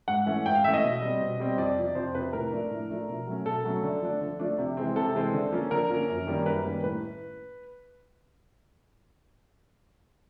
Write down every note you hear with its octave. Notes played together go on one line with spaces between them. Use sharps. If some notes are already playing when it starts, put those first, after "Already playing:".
G#2 F#5
E3 A3 C#4
G#2 G5
F5
E3 A3 C#4 E5
D#5
B2
G3 C4
B2
G3 C4
F2 D5
C3 F3
F2 C5
C3 F3 B4
A2 A#4
F3 A3 D4
A2
F3 A3 D4
B2
F#3 A3 C#4
B2 A4
F#3 A3 C#4
D3
F3 A3 D4
D3
F3 A3 D4
C3
E3 G#3 C4
C3 A4
E3 G#3 C4
D3
F3 A#3 C#4
D3 A#4
F3 A#3 C#4
F#2
D#3 G3 A#3 C#4
F#2 B4
D#3 G3 A#3 C#4
A2 B4